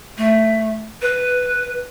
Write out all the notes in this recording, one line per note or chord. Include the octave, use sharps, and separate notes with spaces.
A3
B4